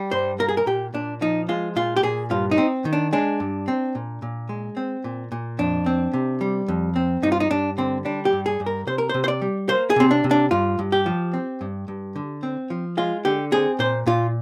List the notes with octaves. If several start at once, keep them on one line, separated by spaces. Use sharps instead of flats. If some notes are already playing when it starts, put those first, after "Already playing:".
Already playing: G3
G2 C5
A#3 A#4
G#4
A#4
A#2 G4
A#2 D4
F3 D#4
G#3 F4
A#2 F4
G4
A#2 G#4
G2 F4
D#4
C4
D#3
D4
G#3 D4
G2
C4
A#2
A#2
G#3
C4
A#2
A#2
F2 D4
C4
C3
G3
F2
C4
G2 D#4
F4
D#4
G2 D4
D3 C4
G3 D4
G4
G2
G#4
G2
A#4
C3 C5
A#4
C3 C5
C5
D5
G3
A#3 C5
G#4
C3 C4
D4
C3
D4
G2 F4
G2
G4
F3
C4
G2
G2
D3
C4
F3
G#3 F4
D3 G4
C4 G#4
A#2 C5
A#2 F4